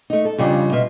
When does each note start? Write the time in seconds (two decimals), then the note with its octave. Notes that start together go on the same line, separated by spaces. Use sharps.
0.10 A3 D#4
0.25 A4
0.38 F2 C#3 G3 D4
0.72 B2 F4 E5